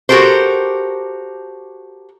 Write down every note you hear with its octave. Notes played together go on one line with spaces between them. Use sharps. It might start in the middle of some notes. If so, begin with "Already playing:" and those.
F#4 G4 A4 A#4 C5